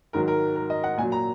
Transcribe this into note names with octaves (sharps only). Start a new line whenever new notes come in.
G#2 D#3 F#3 A#4
A#4
A#4
D#5
F#5
A#2 F#3 G#5
A#5